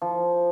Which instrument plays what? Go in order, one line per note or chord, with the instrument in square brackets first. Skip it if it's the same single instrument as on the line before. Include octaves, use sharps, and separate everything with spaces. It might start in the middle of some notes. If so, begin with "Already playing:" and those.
[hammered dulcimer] F3